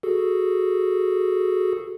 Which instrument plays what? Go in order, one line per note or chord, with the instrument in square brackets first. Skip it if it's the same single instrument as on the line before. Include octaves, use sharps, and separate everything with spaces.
[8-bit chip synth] F#4 G#4 A4